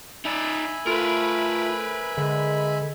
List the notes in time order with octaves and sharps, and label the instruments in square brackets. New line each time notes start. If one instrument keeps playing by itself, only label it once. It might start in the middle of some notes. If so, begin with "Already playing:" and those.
[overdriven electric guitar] D#4 D5 [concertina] E5 G#5 B5
[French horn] A3 [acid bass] F4 [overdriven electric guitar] A#4 B4
[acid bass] D3 [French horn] G#3